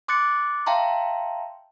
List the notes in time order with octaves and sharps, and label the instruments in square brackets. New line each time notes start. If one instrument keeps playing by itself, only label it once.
[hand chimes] C6 D6 F#6 A6 C#7
E5 F5 G5 A5 A#5 C6